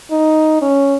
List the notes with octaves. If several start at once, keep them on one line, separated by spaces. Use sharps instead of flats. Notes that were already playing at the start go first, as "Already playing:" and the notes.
D#4
C#4